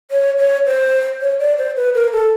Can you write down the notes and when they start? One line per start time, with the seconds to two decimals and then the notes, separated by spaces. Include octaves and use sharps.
0.11 C#5
0.38 C#5
0.66 C5
1.21 C#5
1.39 D5
1.58 C5
1.76 B4
1.94 A#4
2.12 A4